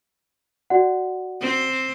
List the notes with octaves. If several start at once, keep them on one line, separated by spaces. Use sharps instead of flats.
F#4 D5 F#5
C4